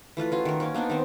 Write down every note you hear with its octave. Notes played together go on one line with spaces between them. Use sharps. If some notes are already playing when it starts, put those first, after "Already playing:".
E3 A3 F4 B4
C#4 F4 F#4
D#3 A#4
A#3 C#4
A#3 B3 D4 D#4
D#3 B3 C4